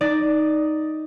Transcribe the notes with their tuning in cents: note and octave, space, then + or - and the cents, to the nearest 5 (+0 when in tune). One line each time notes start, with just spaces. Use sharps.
D#4 +0 D5 +0